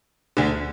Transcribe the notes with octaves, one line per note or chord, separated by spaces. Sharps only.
D2 D3